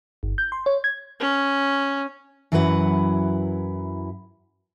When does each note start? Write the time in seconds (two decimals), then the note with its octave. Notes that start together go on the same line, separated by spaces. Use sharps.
0.23 G1
0.38 G6
0.52 C6
0.66 C#5
0.84 G#6
1.20 C#4
2.52 F#2 E3 F#3 E4 B4 F#5